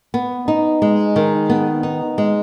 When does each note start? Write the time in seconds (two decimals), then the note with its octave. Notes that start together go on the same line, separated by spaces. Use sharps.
0.14 B3
0.48 D#4
0.82 G#3
1.16 D#3
1.50 B3
1.83 D#4
2.18 G#3